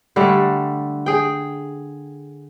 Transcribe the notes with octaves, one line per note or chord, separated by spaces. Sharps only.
D3 G3 A3
G#4 G5